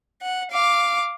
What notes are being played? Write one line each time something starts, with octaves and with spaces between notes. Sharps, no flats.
F#5
F5 D6